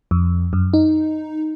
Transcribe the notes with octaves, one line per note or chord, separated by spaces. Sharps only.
F2
F#2
D#4